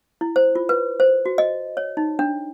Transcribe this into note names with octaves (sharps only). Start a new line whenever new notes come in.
E4
C5
F4
B4
C5
F#4
D#5
C#5
D#4
D4